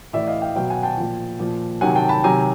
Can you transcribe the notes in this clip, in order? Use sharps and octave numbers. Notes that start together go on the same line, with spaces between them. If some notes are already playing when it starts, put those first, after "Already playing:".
A2 E3 D5 E5
D#5 F5
F5 G5
B2 F#3 F5 G5
F#5 G#5
G5 A5
A#2 F3
A#2 F3
C3 D#3 F#3 F#5 G#5
G5 A5
A5 B5
C3 D#3 F#3 G#5 A#5